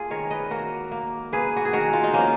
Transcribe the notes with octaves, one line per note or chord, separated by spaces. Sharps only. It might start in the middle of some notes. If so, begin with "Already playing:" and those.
Already playing: A#3 F4 G#4
D#3 A#4 C#5
B4 D#5
A#3 F#4 A#4
A#3
A#3 G#4 B4
F#4
G#4
D#3 F#4 A#4
F4
D#4
F3 A#3 C#4